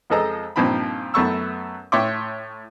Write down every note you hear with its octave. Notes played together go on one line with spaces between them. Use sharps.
F2 F3 G#3 A4 D#5 A#5
G2 A#2 F3 C4 D#4 B5
F#2 A3 B3 C#6 E6
A2 C#5 E5 G5 C6 D6